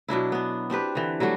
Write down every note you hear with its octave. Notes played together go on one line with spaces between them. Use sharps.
B2 F#3 D4 E4
B3 D4
C4 D4 G4 B4
D3 E3
F#3 G3 A3 F#4